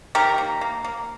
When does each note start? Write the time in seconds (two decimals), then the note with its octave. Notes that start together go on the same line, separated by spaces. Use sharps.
0.15 D#3 G4 A#4
0.38 A#3
0.61 A#3
0.84 A#3